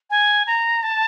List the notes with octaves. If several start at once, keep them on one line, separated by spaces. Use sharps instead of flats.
G#5
A#5
A5